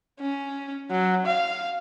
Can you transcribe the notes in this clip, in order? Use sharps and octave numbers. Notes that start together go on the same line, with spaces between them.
C#4
F#3
F5